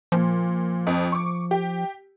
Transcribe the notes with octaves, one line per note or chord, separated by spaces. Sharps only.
A#2 F3
F2
C#6 D6
G4